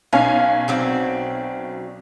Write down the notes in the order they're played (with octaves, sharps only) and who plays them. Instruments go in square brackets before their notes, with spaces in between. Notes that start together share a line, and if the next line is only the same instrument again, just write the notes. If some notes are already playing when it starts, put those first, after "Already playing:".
[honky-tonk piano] B1 C#4 G#5 [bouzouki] F5
[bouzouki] F#3 C4 D5